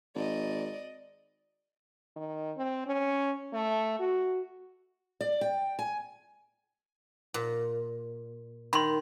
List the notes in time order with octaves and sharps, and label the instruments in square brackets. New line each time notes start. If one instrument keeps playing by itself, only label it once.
[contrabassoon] G#1 [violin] D5 D#5
[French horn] D#3
C4
C#4
A3
F#4
[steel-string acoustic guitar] D5
G5
G#5
[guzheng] A#2
[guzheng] D#3 [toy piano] B5 C6